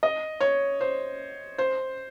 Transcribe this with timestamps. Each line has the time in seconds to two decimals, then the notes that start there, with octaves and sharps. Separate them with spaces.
0.03 D#5
0.41 C#5
0.81 C5
1.58 C5